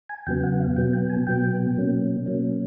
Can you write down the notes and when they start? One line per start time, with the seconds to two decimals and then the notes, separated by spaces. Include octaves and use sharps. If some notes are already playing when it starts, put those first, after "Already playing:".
0.10 G#5
0.27 E2 C#3 F#3 B3 G5
0.43 F#5
0.60 F5
0.76 B2 F#3 B3 G5
0.93 G5
1.10 G#5
1.27 B2 F#3 B3 G5
1.77 B2 F#3 A#3 C#4
2.26 B2 F#3 A#3 C#4